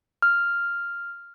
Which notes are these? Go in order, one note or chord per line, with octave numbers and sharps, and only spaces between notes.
F6